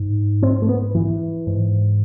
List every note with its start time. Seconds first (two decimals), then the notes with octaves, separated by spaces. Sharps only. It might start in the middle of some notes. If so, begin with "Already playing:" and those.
Already playing: G#2
0.43 C4
0.62 A3
0.69 B3
0.95 E3
1.47 G#2